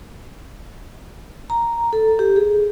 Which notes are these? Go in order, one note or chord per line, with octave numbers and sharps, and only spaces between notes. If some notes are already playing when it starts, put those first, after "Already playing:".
A#5
A4
G4
G#4